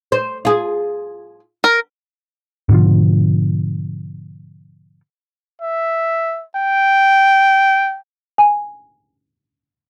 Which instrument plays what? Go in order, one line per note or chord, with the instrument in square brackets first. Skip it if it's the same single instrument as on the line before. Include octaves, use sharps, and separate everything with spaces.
[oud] C5
F4 G#4
[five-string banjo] A#4
[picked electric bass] G#2 B2 D3 F3
[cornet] E5
G5
[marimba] G#5